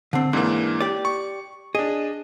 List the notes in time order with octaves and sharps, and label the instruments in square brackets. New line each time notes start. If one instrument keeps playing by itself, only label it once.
[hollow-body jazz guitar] D3 C4
[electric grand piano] G#2 E3 A#3 [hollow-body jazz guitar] D4
[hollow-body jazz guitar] G4 D5
[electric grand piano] C#6
[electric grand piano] D4 D#5 [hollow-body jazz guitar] G#4